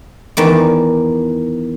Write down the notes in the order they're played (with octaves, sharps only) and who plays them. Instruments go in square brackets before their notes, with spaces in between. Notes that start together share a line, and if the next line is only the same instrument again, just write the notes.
[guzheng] E2 D#3 D5